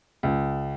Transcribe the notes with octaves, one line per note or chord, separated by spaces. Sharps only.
C#2